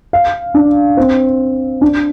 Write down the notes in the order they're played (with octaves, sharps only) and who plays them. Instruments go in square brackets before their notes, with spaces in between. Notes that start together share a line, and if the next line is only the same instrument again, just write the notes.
[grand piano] F5
D4
C4
D4